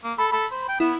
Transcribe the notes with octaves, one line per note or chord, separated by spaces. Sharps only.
A#3
A4 B5
A4 B5
C5
G5
B3 E4